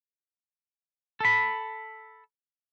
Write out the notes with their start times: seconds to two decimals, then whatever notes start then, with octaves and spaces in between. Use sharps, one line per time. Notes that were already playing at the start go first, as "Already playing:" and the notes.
1.21 A4 B5